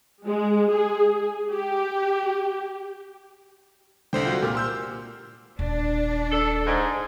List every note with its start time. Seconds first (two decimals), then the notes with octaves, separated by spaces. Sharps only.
0.25 G#3
0.69 G#4
1.53 G4
4.13 C2 D3 C4 C5 G5
4.26 F4 F#4
4.42 A#2 G4 F6
4.55 C6 E6 G6
5.59 D#1 D4
6.32 A4
6.66 G#2